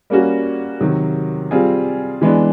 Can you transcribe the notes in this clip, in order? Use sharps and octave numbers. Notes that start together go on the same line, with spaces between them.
G3 A#3 C#4 F#4
C3 D#3 F#3
G3 C4 F4 G#4
E3 G#3 B3 D4